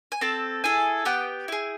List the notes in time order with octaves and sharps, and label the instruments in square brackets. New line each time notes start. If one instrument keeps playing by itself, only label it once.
[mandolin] G#5
C4 A4 A5
E4 G#4 A4 G#5
B3 G4 G5
E4 G#4